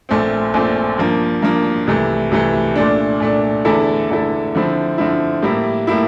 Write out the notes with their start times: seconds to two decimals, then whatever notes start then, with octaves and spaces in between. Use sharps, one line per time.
0.09 A#1 A#2 A3 C4
0.54 A#1 A#2 A3 C4
0.98 G2 F3 A#3
1.42 G2 F3 A#3
1.87 C2 C3 E3 A3
2.31 C2 C3 E3 A3
2.76 A#2 A3 D4
3.20 A#2 A3 D4
3.65 E2 D3 A3 E4 A4
4.10 E2 D3 A3 E4 A4
4.55 D3 F3 C4 E4
4.98 D3 F3 C4 E4
5.42 A2 G3 A#3 E4
5.87 A2 G3 A#3 E4